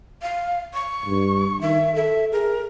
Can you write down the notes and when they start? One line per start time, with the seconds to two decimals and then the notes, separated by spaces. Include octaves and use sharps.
0.22 F5
0.74 C#6
1.06 G2
1.61 D#3 E5
1.95 A4 E5
2.32 G#4 A#4